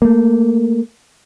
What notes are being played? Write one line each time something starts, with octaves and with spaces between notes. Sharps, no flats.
A3 A#3